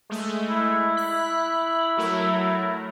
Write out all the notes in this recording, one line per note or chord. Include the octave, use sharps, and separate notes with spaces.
G#3 A3
E4
F#6 B6
F#3 A3 A#4